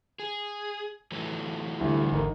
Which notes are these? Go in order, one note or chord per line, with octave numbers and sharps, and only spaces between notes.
G#4
E3 F#3 A3
D2 G3 E4
G#1 D#4 A#4